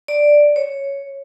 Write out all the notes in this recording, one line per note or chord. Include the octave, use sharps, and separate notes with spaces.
D5
C#5